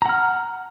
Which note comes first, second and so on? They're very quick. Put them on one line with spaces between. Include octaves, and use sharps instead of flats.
A#5 F#5 F6